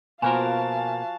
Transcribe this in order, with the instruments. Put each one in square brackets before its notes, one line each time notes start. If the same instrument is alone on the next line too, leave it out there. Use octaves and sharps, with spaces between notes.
[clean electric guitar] B2 A#3 A#4 [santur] F3 F#4 [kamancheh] F5 A5 [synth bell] G#5